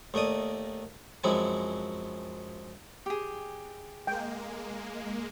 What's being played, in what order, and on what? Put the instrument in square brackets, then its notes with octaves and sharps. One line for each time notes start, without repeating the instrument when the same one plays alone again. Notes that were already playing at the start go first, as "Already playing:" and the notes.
[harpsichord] D#2 A3 A#3 D5 D#6
F#2 F3 F#3 G#3 C4 E4
[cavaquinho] G4 G#4
[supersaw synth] G#3 A#3 [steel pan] G5